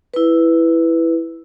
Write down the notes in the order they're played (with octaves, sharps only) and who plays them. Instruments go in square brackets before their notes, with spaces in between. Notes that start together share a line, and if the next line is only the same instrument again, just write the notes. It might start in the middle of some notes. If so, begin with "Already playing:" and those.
[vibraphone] E4 B4